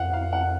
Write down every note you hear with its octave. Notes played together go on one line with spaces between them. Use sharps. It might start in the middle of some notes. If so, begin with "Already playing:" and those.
Already playing: F2 F5 F#5
F5
F#5